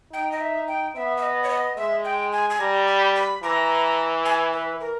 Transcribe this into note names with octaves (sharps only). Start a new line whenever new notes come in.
D#4 G5
D#5
E5
G5
B3 E5
E5
D#5
C#5
D#5
G#3 E5
G5
G#5
G#5
G3 A#5
B5
B5
E3 A#5
G#5
B4
A#4